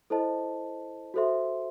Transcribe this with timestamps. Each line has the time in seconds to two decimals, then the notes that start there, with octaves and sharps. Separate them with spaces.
0.10 E4 A4 C5 D#5 A5
1.14 F#4 A4 C5 E5 C6